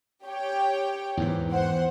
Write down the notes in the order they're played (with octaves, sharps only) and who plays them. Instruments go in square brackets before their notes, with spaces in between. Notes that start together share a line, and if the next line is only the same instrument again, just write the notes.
[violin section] G4 C#5 G5
[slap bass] E2 G#2 E3
[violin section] C5 F#5